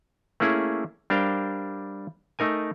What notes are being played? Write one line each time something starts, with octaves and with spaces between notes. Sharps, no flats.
A3 A#3 C#4 E4 G#4
G3 D4 A#4 C5 F5 G5
A3 D#4 A#4 G#5